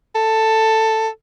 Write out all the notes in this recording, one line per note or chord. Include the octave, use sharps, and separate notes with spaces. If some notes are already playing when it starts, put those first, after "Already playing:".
A4